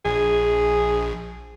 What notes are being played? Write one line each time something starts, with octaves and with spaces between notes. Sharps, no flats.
A#1 G#4